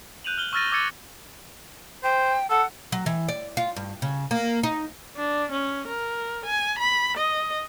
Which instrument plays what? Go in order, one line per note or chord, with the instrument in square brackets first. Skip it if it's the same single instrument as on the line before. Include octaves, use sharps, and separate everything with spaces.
[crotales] F#6 G6 D#7 F7 F#7
F6 F#7 G7
C#6 E6 F6 A6 A#6 D#7
D6 E6 G#6 A6 C#7 D#7
[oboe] C5 [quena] G5
[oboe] A4 [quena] F#5
[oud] F#3
E3
D5
F4
G2
C#3
A#3
D#4
[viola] D4
C#4
A#4
G#5
B5
D#5